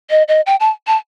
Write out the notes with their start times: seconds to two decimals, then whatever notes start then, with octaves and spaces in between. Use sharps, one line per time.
0.10 D#5
0.28 D#5
0.46 G5
0.60 A5
0.87 A5